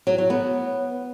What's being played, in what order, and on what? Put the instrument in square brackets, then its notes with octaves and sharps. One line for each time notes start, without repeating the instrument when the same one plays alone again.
[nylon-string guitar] F#3
F#3
B3